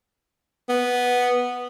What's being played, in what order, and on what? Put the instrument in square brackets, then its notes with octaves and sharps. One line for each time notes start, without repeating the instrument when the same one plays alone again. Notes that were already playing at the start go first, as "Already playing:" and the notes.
[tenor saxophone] B3